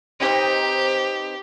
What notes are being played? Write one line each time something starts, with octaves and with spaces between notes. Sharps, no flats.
C4 D#4 G4 B4